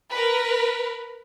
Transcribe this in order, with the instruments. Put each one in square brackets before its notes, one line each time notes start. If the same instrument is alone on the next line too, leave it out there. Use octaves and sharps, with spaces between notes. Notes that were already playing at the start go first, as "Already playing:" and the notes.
[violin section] A#4 B4